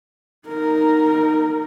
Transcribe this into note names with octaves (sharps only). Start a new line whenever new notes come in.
D#4 A#4